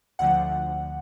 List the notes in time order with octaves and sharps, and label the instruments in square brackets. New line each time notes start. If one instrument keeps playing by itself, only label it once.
[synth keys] D2 D3 F3 F#5